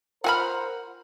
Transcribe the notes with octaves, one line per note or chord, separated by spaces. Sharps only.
F4 A#4 C5 F#5 G#5 B5 F6